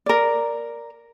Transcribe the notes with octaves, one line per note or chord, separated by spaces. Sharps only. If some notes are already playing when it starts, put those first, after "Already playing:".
A#4 D5